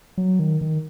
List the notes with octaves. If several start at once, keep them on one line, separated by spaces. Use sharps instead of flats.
F#3
D#3
D#3